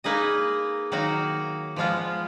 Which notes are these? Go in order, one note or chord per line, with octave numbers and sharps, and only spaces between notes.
A#3 D#4 G#4 B4 D#5
D#3 F#3 A#3 D#4 F#4
F3 G#3 B3 F4